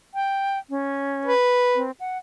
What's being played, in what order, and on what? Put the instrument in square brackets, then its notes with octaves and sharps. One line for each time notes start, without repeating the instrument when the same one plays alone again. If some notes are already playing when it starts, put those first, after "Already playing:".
[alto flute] G5
C#4
[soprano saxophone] B4
[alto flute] C4
F#5